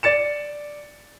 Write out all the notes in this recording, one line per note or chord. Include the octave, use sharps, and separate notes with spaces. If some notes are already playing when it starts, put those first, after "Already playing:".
D5 A6 C#7 E7